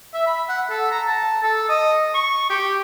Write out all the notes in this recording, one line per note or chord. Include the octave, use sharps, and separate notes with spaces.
E5
B5
F#5
A4
A#5
A5
A4
D#5
C#6
G4